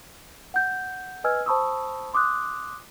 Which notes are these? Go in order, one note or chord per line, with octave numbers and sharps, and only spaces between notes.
F#5 G6
B4 D#5 G#5 E6 F6 G#6
C5 A5 B5 C#6 D#6 E6
C6 D6 D#6 F#6